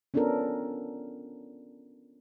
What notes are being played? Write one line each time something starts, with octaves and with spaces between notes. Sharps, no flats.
B3 C#4 D4 F4 A4 A#4